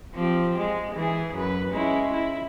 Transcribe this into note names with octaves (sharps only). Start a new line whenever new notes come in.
F3 C4 G4
G#3
E3 G#4
F#2 B4
G#3 C#4 E4
E4